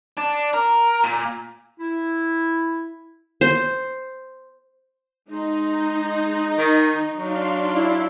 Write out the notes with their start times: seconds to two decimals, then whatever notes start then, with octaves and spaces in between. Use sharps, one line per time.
0.17 D4
0.54 A#4
1.03 A#2
1.80 E4
3.41 C5
5.29 G#3 D#4
6.58 D#3
7.17 F#3 D4 F5 C6
7.72 E4